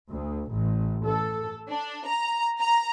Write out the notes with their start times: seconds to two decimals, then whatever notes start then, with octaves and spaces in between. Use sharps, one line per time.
0.10 D2
0.51 A1
1.06 A4
1.68 D4
2.06 A#5
2.60 A#5